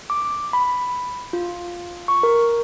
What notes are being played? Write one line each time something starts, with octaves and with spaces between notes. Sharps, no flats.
D6
B5
F4
C#6
A#4